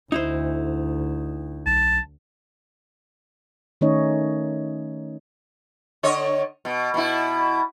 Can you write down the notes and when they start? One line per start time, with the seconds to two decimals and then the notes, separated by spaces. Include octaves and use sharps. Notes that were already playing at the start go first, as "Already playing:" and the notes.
0.12 D2 D#4 E4 C5
1.66 B1 A5
3.81 D#3 A3 C#4 D#4 C#5 D#5
6.03 D3 C#5 D#5
6.65 B2
6.94 B2 E4